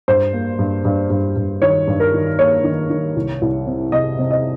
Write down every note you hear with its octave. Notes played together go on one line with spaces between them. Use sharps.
G2 C5
A#3
G2
G2
G2
G2
D#3 C#5
G2
A#4
D#3
A#3 C#5
D#3
D#3
C2
C2
C3
C3 D#5
C3
D#5